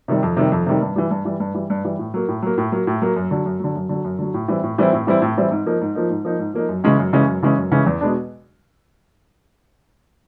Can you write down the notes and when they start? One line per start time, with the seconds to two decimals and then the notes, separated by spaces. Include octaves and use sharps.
0.08 C3 D#3 G3
0.23 F2
0.37 C3 D#3 G3
0.52 F2
0.67 C3 D#3 G3
0.81 G2
0.96 E3 G3
1.10 G2
1.25 E3 G3
1.40 G2
1.54 E3 G3
1.70 G2
1.85 E3 G3
1.99 A2
2.14 F#3 A#3
2.28 A2
2.42 F#3 A#3
2.58 A2
2.72 F#3 A#3
2.87 A2
3.02 F#3 A#3
3.16 F#2
3.31 D3 F#3
3.46 F#2
3.60 D3 F#3
3.75 F#2
3.89 D3 F#3
4.05 F#2
4.19 D3 F#3
4.34 A2
4.48 E3 G3 C4 E4
4.63 A2
4.78 E3 G3 C4 E4
4.93 A2
5.07 E3 G3 C4 E4
5.22 A2
5.37 E3 G3 C4 E4
5.51 G#2
5.66 F3 A#3 D#4
5.81 G#2
5.95 F3 A#3 D#4
6.10 G#2
6.25 F3 A#3 D#4
6.39 G#2
6.54 F3 A#3 D#4
6.69 F#2
6.84 C#3 E3 G#3 C#4
6.99 F#2
7.13 C#3 E3 G#3 C#4
7.27 F#2
7.43 C#3 E3 G#3 C#4
7.57 F#2
7.72 C#3 E3 G#3 C#4
7.86 E2
8.01 B2 G#3 B3 D4